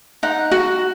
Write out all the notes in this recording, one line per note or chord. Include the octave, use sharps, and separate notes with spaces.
D#4 F#5
F#4